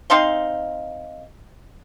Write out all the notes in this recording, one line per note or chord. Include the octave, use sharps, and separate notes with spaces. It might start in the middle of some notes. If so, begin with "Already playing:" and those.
C4 D#4 F5 C6